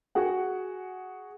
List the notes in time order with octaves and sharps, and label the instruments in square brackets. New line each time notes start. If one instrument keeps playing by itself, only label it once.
[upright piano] F#4 G#4 F#5